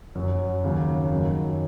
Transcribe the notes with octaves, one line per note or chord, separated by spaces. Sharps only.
F#2 F#3
D#2 C#3 F#3
F#2 D#3 F#3